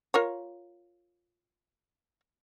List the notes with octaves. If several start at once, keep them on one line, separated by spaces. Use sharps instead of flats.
F4 A#4 C#5